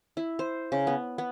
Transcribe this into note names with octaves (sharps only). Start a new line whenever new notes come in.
E4
C5
C#3
B3
B3